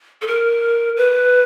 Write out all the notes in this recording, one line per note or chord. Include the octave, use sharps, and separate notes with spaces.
A4
A#4
B4